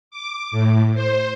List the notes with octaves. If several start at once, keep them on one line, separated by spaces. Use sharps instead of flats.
D6
A2
C5